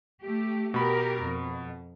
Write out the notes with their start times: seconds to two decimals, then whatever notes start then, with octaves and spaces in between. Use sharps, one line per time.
0.22 A3 G4
0.74 B2 G4 A#4 B5
1.22 F2